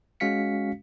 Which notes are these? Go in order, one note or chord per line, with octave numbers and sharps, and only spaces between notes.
G#3 C#4 F#4 F5 B6 C#7